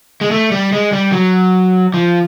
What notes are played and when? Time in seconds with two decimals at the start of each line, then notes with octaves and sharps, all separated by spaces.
0.21 G#3
0.31 A3
0.52 G3
0.73 G#3
0.92 G3
1.12 F#3
1.94 F3